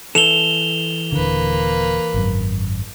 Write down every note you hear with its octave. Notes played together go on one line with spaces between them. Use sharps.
E3 A4 E7 F7 G7
D#1 D3 A#3 B4
G#1 F#2